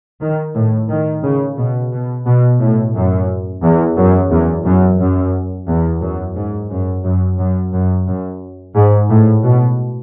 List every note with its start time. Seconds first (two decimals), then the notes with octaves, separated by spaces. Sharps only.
0.21 D#3
0.55 A2
0.90 D#3
1.23 C#3
1.58 B2
1.92 B2
2.26 B2
2.60 A2
2.95 F#2
3.63 E2
3.97 F#2
4.31 E2
4.65 F#2
4.99 F#2
5.68 E2
6.02 F#2
6.36 G#2
6.70 F#2
7.05 F#2
7.38 F#2
7.73 F#2
8.07 F#2
8.75 G#2
9.09 A2
9.44 B2